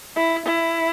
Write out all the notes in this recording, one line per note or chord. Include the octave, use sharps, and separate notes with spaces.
E4
E4